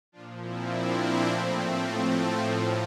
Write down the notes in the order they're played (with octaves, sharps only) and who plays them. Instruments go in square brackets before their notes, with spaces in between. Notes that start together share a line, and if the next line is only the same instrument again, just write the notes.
[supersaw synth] A#2 F3 D4 F4
C4 E4
A#3 D4
A#3
A2 F3 A3 C4
A3
A2 F3 A#3